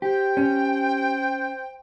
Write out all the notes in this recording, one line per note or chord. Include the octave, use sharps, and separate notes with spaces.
G4 C5 G5
C#4